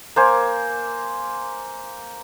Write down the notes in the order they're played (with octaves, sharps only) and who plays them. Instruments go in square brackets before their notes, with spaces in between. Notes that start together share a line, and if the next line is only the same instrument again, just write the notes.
[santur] A#3 C5 G#5